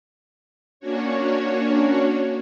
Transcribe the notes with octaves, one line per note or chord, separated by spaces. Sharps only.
A#3 C#4 D4 F#4 C#5